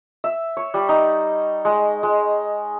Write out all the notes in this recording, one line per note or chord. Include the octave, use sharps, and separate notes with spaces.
E5
C#5
G3
D#4
G#3
G#3